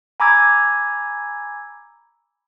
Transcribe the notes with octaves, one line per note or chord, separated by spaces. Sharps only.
G#5 A#5 B5 D6 E6 G#6